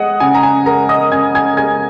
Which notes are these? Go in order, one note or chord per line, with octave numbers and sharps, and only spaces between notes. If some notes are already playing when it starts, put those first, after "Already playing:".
Already playing: G#3 D#5 F#5 D#6
C#3 G#5
A#5
G#5
G#3 A#4 A#5
D#5 D#6
C#3 G#5 G#6
G#5 G#6
G#3 G#5 G#6